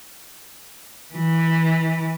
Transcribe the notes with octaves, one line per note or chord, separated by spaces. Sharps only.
E3